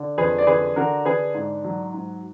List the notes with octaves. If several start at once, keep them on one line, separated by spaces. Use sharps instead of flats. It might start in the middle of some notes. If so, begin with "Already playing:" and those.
Already playing: D3
F2 G#4 B4
D5
D3 G#4 B4
D3 F#4 A#4
D3 G#4 B4
G#2
F#3
G#2